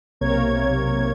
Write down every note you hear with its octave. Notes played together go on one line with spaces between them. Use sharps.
B1 C3 A#3 A#4 C#5 G#6